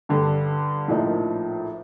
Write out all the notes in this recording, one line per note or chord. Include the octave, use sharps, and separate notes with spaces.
G2 D3 G3
A#1 A2 F3 A#3 D#4